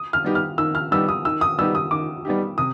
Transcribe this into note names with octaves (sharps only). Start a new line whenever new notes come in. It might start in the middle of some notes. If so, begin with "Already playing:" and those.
Already playing: D#6
F6
G3 B3 D#4 G4
F6
D#3 E6
F6
G3 B3 D#4 G4 E6
D#6
D#3 E6
D#6
G3 B3 D#4 G4 E6
D#6
D#3 D6
G3 B3 D#4 G4
C3 D#6